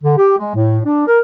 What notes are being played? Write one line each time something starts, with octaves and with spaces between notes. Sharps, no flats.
D3
G4
G#3
A2
D4
A#4